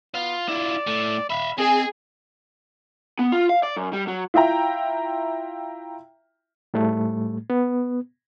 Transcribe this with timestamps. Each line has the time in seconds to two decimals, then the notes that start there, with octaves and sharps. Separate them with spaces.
0.15 B3 F4
0.49 E4 F4 D5
0.87 A2 A3
1.30 E5 F5 B5
1.58 C4 G#4 D#5
3.19 B3
3.32 F4
3.49 F5
3.63 D5
3.76 F#2
3.93 G3
4.08 F#3
4.34 E4 F4 E5 G5 A#5
6.74 A2 G3 A3
7.50 B3